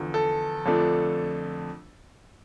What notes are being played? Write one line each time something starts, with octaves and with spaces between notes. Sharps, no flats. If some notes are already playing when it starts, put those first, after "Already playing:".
Already playing: E2 D3 F3
A4
F2 D3 F3 A3 D4